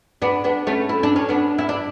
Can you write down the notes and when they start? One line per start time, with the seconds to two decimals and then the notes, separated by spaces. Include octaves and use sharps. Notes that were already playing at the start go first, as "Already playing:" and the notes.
0.22 B3 D4
0.44 B3 D4
0.67 A3 C#4
0.89 E4
1.03 D4
1.16 C#4
1.29 B3 D4
1.58 E4
1.69 D4